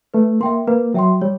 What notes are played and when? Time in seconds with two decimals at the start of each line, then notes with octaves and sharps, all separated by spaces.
0.14 A3 B4
0.41 A#3 E5 G5 C6
0.67 A#3 B4
0.94 F#3 E5 G5 C6
1.21 G3 C#5